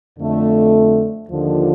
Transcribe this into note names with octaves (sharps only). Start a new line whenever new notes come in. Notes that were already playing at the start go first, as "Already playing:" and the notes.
F2 D3 A3
D#2 D3 F3